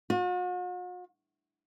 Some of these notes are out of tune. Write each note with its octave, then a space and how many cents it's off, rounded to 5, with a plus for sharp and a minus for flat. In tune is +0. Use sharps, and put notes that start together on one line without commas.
F#4 -45